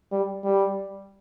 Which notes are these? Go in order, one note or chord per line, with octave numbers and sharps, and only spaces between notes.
G3
G3